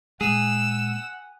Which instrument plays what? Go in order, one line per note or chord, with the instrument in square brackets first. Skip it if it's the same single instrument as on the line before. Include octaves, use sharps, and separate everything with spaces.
[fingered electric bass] A#2 G#3 [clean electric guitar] G#4 [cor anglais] F#5 [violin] E6